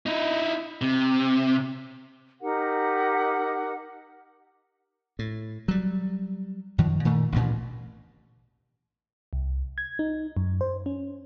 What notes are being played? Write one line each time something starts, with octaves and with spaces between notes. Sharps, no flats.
D#4 E4
C3
D#4 G4 A#4 F#5
A2
F#3 G3
F#2 D#3 F3
A#2 D#3 A3
A1 D2 G2 A#2
C2
G#6
D#4
F#2
C5
C#4